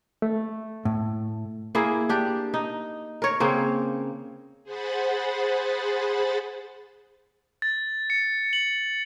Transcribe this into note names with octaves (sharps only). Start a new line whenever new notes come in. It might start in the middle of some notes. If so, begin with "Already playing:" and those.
A3
A2
A#3 E4 G#4
D4 G4
D#4
A#4 C#5
C#3 A#3 C4
G#4 C5 F#5 B5 A6
A6
C#7
F#7